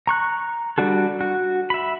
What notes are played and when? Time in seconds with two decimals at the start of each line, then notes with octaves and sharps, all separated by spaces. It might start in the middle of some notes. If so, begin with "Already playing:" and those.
0.07 A#5 C#6 F#6
0.78 G3 D4 F#4 A4
1.21 F#4
1.70 E5 B5